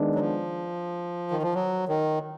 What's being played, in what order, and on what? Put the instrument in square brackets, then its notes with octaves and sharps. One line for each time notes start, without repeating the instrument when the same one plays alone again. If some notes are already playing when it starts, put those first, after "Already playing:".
Already playing: [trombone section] D#3 G#3 B3 D4
[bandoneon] F#3
F3
D#3
F3
F#3
D#3